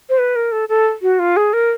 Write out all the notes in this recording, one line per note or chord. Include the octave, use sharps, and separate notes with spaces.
C5
B4
A#4
A4
A4
F#4
F4
G#4
A#4